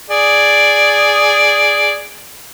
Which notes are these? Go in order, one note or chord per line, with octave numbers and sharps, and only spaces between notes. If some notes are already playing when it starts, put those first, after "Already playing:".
G#4 D5